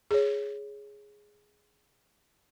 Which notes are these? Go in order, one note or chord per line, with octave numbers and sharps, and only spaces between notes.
G#4 C#5